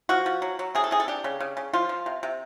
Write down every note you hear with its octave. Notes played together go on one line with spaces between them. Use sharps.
F3 F#4
F3
F#3
F#3
C3 G#4
A4
C3 G#4
A4
D4 G4
C#3
C#3
C#3
F3 F4
F3
C3
C3